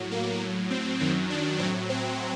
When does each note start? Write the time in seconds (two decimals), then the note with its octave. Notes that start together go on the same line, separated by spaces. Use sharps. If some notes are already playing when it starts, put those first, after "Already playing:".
Already playing: A2 F#3
0.11 A#3
0.41 A2 F#3
0.70 C4
0.99 F#2 D#3 F#3 C4
1.30 D4
1.59 A2 F#3 C4
1.89 C4